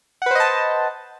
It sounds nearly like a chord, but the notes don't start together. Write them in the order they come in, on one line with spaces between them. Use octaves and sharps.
F#5 B4 C5 D#5 A5